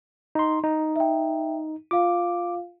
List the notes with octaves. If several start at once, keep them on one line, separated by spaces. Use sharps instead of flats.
D#4 C6
D#4
E5 G5
F4 F5 D6